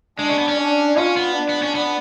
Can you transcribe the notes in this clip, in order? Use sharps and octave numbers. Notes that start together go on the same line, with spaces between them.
G#3 D4
C#4
B3
C#4
D4
C#4 F4
B3
D4
B3
C#4
B3